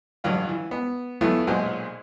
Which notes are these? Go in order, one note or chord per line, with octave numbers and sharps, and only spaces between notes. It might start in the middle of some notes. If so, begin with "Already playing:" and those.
A1 G2 F#3 F4 F5
E3
B3
E3 F#3 A3 B3 E4 F4
B1 A#2 F#3 G#3 C5 F#5